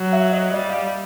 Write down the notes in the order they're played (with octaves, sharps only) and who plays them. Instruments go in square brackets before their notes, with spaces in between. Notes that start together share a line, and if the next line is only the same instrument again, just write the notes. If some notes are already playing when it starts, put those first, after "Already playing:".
Already playing: [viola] F#3
[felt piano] E5
D#5
[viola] G3 [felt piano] D#5
[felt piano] F5